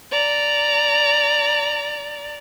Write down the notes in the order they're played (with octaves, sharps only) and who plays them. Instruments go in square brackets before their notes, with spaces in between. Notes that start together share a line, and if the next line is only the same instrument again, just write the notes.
[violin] D5 A#5